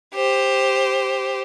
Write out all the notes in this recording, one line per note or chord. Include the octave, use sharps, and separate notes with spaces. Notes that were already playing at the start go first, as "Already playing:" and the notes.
G4 C5